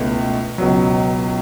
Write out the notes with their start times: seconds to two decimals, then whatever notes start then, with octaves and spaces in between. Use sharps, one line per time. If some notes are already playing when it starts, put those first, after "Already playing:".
Already playing: C#2 B2 A3 C#4 E4
0.58 C#2 B2 F#3